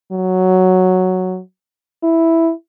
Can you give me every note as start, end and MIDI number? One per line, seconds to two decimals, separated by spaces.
0.12 1.40 54
2.03 2.51 64